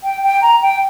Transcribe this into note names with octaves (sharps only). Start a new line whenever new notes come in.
G5
G5
A#5
G5